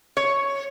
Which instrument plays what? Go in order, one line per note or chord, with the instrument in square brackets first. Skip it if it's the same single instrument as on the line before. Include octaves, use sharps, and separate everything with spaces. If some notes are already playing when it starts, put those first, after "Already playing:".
[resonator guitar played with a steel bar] C#5